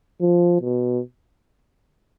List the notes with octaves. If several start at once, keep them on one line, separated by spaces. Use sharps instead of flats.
F3
B2